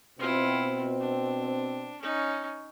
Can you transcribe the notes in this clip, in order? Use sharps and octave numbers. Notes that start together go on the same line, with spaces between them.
B2 C4 E4 F4
D4
C#4 D#4